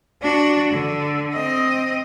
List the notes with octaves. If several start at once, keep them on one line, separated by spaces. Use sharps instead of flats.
D4 F#4
D3
C4 D#5